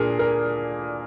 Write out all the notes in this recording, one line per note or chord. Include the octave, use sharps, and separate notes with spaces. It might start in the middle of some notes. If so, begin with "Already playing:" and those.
Already playing: A#2 D4 G#4 A#4
A#4